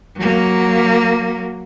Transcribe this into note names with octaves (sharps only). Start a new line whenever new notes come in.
F#3 A#3